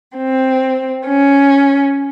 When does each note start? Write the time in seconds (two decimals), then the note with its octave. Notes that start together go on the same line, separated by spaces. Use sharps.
0.17 C4
1.05 C#4